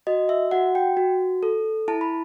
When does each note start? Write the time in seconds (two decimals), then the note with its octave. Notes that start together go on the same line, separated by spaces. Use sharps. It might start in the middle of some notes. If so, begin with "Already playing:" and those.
0.07 F#4 D#5
0.29 E5
0.51 F#4 F#5
0.75 G5
0.97 F#4
1.43 A4
1.88 E4 A5
2.01 B5